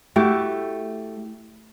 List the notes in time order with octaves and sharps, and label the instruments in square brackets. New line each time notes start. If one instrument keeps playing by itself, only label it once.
[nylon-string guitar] A3 [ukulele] E4 F#4 G4